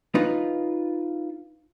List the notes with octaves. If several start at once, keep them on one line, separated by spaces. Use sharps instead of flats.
D#4 F4 B4